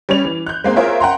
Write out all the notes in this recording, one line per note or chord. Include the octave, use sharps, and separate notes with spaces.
G3 C#4 C#5 F7
E3
F#6 G6
G#3 A#3 C4
F4 G#4 A#4 C5 C#5 E5
F#5 G5 A#5 C6